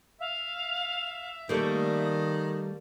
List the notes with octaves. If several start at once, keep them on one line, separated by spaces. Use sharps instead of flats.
E5 F5
D#3 G3 A3 A#3 D#6